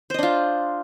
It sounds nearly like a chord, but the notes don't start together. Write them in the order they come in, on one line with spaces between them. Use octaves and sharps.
C5 D#5 D4 F4